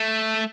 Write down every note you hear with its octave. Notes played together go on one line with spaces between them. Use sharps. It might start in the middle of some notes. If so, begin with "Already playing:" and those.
Already playing: A3